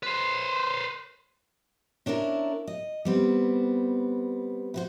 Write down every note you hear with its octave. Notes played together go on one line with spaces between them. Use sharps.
B4 C5
C#4 D4 E4 A4 A#4
D#5
G3 B3 C4
E4 F#4 C5